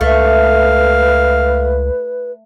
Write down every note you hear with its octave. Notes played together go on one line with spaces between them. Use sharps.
C#2 A3 B4 F5